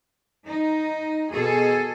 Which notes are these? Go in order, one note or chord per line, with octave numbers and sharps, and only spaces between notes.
D#4
B2 G#4 A4